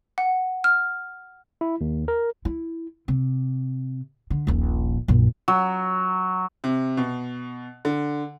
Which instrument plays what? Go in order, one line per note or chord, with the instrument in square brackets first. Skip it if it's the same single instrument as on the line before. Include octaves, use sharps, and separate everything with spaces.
[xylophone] F#5
F6
[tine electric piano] E4
D#2
A#4
[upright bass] E4
C3
D3
D#1 A#1
A#1 F#2
[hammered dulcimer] F#3
[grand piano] C3
B2
D3